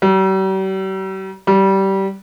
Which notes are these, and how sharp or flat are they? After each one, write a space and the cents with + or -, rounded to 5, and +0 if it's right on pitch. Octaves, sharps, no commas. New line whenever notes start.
G3 -45
G3 -20